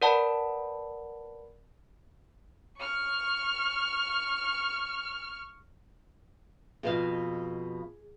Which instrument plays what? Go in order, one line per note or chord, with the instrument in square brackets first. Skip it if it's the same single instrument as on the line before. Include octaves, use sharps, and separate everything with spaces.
[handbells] A#4 B4 D5 F#5 A5 B5
[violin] C#6 F6
[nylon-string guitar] F2 B2 F5 [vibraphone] G#4